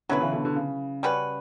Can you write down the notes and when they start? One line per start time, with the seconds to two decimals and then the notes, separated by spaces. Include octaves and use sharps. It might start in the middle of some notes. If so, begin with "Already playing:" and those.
0.09 B2 D3 F#3 C#4 E4 B4
0.20 C#3 E3
0.33 B2 D3
0.44 B2 D3
0.55 C#3
1.03 G3 C#4 F#4 B4